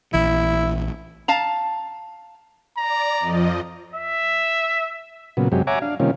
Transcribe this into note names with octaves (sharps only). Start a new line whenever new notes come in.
A#1 E3 E4
F5 A5 A#5
D5 A#5
F2 F3 D#5
E5
A#2 C#3 F#3 B3
F#2 C3 F#3 G#3 G4
C#5 E5 F#5 G#5 A#5 D6
D4 F5
C3 D#3 G3 A#3 C#4 F4